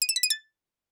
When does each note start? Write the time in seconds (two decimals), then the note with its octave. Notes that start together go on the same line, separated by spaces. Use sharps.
0.02 D#7
0.09 E7
0.16 B6
0.23 D#7
0.30 A6